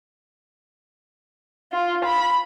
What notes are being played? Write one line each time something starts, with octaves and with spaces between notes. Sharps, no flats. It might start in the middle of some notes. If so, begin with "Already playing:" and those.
F4
B5